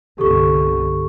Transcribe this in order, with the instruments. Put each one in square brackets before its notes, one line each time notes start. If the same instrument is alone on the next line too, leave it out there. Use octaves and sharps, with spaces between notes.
[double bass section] G1 C2 D3 [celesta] G4 A4 C#6